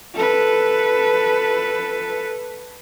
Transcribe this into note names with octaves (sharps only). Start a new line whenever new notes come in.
A4 B4